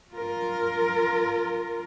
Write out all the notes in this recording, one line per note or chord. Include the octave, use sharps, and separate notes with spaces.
F4 A#4